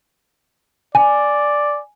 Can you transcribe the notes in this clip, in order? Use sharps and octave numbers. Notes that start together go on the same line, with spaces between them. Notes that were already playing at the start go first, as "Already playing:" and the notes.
D5 G#5